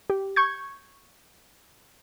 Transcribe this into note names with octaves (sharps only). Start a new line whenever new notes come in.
G4
C#6 G6 G#6